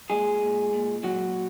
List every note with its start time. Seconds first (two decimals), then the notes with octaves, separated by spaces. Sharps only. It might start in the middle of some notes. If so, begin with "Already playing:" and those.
0.10 A#2 G#3 G#4
0.42 A#2
0.73 A#2
1.03 A#2 F#3 F#4